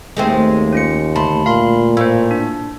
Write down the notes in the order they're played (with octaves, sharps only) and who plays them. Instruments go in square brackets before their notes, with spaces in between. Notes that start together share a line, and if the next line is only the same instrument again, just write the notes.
[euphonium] D#2 [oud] G#3 A3 C4
[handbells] C#4 F4 C#7
[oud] D2 [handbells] A5 B5 C6
[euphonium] A#2 [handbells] F5 B5 C6
[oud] A2 [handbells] A#3 C5
[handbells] D4